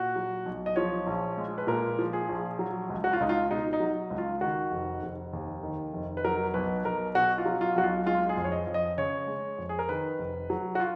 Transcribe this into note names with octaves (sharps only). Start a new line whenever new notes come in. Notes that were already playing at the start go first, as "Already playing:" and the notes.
Already playing: A#2 F#4
F#3
B1
D#5
F3 C#5
A#1
G#3
B4
A#2 A#4
F3
G#4
A#1
F#3
C#2
F#4
F4
C#2 D#4
F4
B2 D#4
D#4
F#3
C#2
F4
D#3 F#4
F1
F1
D#2
D#3
F1
B4
F#3 A#4
B1 B4
B1 A#4
B2 F#4
F4
F#3
F4
B1 F#4
F4
G#3 F4
G#4
F2
C#5
D#5
F2
D#5
C#3 C#5
G#3
F2
G#4
A#4
D#3 B4
F1
F#3
F#4
F4